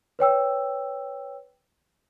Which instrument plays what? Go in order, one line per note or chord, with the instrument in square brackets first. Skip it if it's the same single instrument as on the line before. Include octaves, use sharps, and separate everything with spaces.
[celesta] B4 C#5 G5 E6